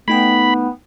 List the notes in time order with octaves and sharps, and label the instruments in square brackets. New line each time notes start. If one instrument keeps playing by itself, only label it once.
[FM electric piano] A3 D#4 G5 [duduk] B3 [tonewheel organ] B5